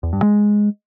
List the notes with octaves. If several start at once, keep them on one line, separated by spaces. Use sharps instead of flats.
E2
G2
G#3